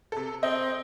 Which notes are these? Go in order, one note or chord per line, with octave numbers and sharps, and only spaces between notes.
C3 A4
C4 D#5